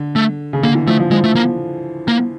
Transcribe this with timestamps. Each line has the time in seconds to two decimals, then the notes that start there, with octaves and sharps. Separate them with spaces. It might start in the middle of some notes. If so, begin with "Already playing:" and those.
Already playing: D3
0.16 A3
0.53 C#3
0.63 D3 A#3
0.75 E3
0.87 F3 A3
1.00 F3
1.11 F3 G#3
1.24 A3
1.35 A#3
2.08 A#3